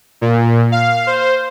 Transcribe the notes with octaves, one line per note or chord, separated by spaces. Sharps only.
A#2
F5
C5